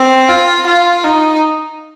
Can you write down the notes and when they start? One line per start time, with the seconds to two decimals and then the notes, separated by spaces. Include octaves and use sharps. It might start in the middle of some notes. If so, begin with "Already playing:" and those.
Already playing: C4
0.29 F4
0.66 F4
1.04 D#4